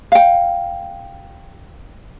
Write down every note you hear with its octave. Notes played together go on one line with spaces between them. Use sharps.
F5 G5